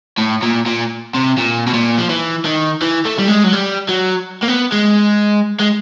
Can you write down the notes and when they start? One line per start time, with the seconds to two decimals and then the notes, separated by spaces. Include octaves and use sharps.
0.18 A2
0.42 A#2
0.66 A#2
1.14 C3
1.38 A#2
1.67 B2
1.73 A#2
1.98 F3
2.09 E3
2.45 D#3
2.81 E3
3.05 A3
3.19 G3
3.28 G#3
3.44 F#3
3.53 G3
3.89 F#3
4.42 A#3
4.48 B3
4.72 G#3
5.60 G#3